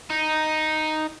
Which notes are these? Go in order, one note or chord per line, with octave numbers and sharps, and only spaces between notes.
D#4